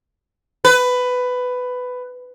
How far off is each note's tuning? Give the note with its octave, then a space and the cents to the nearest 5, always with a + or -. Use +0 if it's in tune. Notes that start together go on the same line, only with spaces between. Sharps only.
B4 +15